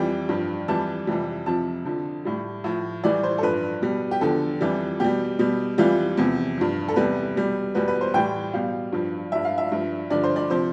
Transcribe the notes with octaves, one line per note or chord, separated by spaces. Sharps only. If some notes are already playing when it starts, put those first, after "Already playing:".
Already playing: F2 E3 G3 G5
G2 F3
F2 E3 G3 A5
F2 C3 E3 G3
F2 C3 F3 A5
F2 D3 F3
A2 G3
A2 F3
A2 E3 G3 D5
C5
A4
G2 F3 B4
B2 G3
G4
E2 D3 F3 A4
F2 E3 G3
B2 G3 G4
B2 G3
F2 E3 G3 F4
E2 C3 F3
G2 F3
A4
E2 C3 G3 B4
B2 G3
E2 B2 G3 B4
B4
C5
A2 E3 G3 G5
B2 G3 F5
G2 F3
G2 F3 E5
F5
E5
G2 F3
G2 D3 F3 D5
C5
D5
C3 F3 C5